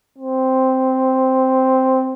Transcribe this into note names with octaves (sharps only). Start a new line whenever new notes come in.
C4